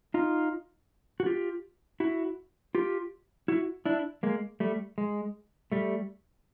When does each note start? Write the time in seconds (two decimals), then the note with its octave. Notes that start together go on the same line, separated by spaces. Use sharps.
0.14 D#4 F4
1.20 F#4
1.26 F4 G4
2.00 E4 F#4
2.75 F4 G4
3.48 E4 F#4
3.85 D4 E4
4.23 G#3 A#3
4.60 G3 A3
4.98 G#3
5.72 G3 A3